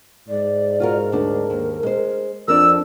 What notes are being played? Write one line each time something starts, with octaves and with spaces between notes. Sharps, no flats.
G#2 D5
F4 F#4 A#4
D2 D4 A#4
D#2
G#3 C5
F2 D4 A#4 D5 E6